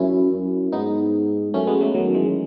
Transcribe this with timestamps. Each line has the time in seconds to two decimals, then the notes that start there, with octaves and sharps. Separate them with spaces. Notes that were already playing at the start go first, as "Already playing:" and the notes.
Already playing: F#2 C#4 E4
0.33 F#2
0.72 G#2 B3 D#4
1.54 F#2 A3 C#4
1.67 G#3 B3
1.81 F#3 A3
1.94 F#2 D#3 F#3
2.14 E3 G#3